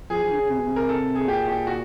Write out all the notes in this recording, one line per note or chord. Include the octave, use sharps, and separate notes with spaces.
F3 G#4
F3
D3
C#3
C3
B2
C3
A#4
A4
G#4
A#2 G4
G4
F#4